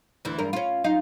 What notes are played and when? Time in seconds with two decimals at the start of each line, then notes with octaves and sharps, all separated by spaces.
0.25 D2 E3
0.38 E2 G2 A#4
0.53 C#4 F4
0.84 F#2 D#4 F4